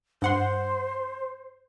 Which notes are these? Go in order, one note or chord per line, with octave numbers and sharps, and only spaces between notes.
G2 C5 F#5 C6